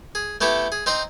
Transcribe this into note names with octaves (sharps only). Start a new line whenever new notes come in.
G#4
A3 B3 E4 G4 A4
G#4
C4 D#4 C5 A#5